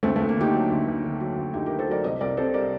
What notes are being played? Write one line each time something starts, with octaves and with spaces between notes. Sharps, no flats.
D2 A3 C4
A3
D2
A#3
D3 D#4 G4
F#3
D2
D2
D3
F#3
D2
D2 D#4 G4
G4 A#4
D3
A4 C5
F#3 A#4 D5
C2 C5 D#5
C2 A#4 D5
C3 A4 C5
G3 A#4 D5